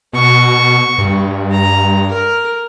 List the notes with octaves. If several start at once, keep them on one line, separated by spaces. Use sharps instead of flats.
B2 F#4 C#6
G2
A#5
A#4